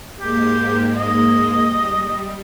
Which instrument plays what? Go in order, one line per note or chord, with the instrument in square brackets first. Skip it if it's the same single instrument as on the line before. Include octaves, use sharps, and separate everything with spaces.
[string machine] G#2 G#3 A#3 [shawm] G4
[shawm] D#5
[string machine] G3